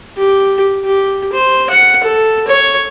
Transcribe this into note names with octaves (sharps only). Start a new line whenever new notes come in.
G4
G4
C5
F#5
A4
C#5